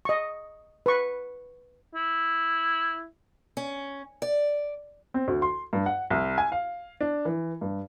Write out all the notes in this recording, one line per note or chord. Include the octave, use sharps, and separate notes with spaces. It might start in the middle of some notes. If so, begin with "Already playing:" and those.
D#5 C#6
B4 C#6
E4
C#4
D5
C4
D2
C6
G2
F#5
C2
G#5
F5
D4
E3
G2